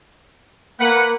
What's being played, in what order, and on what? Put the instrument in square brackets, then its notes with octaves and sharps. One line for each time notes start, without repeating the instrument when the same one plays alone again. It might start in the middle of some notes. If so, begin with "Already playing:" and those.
[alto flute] A#3 [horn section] B4 F#5